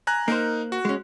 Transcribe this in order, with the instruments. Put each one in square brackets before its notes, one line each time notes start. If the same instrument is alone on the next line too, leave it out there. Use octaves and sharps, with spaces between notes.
[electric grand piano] G#5 A#5 F#6
[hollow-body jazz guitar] A#3 C5 [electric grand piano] D#4 A#4
[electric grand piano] F#4
[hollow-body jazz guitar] G#3 C#4